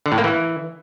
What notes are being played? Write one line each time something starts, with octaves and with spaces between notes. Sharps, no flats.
D3
A2
A#3
E3